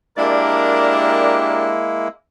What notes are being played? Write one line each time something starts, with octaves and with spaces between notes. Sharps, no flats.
G#3 A#3 D4 E4 G4 A#4 D5